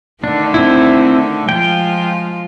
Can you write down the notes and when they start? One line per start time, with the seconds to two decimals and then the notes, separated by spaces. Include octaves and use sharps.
0.24 D3 D#3 A3 D4
0.54 C4 E4
1.49 F3 G#3 F4 G5